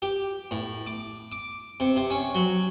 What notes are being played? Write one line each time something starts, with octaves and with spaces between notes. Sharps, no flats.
G4
A2
D6
D6
C3
C3
C#4
F#3